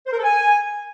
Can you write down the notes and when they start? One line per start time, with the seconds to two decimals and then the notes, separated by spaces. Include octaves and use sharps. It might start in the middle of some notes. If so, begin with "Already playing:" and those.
0.06 C5
0.12 A#4
0.18 A4
0.24 G#5